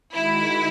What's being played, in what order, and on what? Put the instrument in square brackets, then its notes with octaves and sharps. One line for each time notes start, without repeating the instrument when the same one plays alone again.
[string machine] D#3 G#3 D#4 F#4 [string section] E4